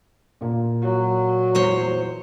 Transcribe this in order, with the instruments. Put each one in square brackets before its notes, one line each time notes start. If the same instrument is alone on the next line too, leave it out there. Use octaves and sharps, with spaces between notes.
[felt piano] A#2 A#3
[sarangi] F#3
[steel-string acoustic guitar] E2 C5 C#5